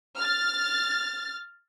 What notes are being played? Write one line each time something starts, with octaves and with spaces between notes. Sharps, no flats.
F6 A6